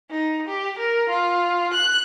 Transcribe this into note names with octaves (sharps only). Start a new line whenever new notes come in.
D#4
G4
A#4
F4
F#6